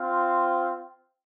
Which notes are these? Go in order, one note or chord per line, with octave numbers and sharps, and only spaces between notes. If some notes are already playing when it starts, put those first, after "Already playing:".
Already playing: C4 F4